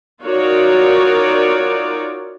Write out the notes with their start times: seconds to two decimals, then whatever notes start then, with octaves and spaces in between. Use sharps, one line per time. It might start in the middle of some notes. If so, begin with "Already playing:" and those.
0.22 D#4 F4 F#4 A#4 C#5 D5